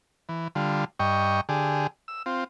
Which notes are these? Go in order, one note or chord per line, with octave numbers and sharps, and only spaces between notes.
E3
D3 G3 F4
G2 D#5 G5 C#6
D3 G4 G#4
E6
C4 F4